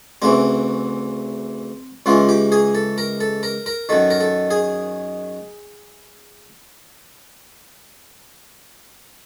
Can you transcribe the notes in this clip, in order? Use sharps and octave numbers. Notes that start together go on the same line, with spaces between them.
D2 C#3 E3 C4
C#2 C#3 E3 F4
G4
G#4
A4
A#4
A4
A#4
A#4
F#2 D#3 A4
A#4
A4
G#4